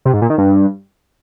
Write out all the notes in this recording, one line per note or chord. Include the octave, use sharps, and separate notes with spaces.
C3
G#2
A#2
D#3
G2